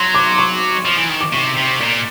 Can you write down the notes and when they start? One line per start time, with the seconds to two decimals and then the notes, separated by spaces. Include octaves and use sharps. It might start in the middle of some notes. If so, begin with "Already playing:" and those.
Already playing: F#3 C6
0.15 D6
0.38 C#6
0.85 F3
0.97 E3
1.09 D#3
1.21 D6
1.32 C3 C#6
1.56 C3
1.80 A#2